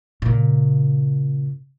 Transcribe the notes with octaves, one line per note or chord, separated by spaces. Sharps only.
A#2 C#3